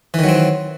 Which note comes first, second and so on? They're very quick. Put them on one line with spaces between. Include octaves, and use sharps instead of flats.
E3 D#3 F#3 C4